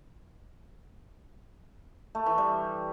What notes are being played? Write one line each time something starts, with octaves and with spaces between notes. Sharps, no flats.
A3
E3
G3